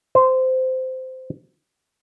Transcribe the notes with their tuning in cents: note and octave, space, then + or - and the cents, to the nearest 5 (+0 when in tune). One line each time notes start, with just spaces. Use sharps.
C5 -15